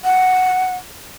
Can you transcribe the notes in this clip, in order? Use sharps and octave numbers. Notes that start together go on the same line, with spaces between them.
F#5